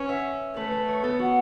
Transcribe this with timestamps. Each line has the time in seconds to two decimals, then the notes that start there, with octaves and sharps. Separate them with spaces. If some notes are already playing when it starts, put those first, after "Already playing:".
Already playing: C#4 B4 C#5
0.09 E5
0.56 A3 B4
0.71 B4
0.88 C#5
1.03 B3 A4
1.19 F#4